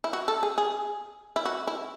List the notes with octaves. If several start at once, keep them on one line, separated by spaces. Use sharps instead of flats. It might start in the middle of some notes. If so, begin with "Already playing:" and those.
E4
F#4
A4
G#4
G#4
E4
F#4
E4